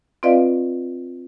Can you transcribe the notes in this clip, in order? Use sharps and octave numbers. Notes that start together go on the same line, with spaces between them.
C4 F4 B4 D5 D#5 F5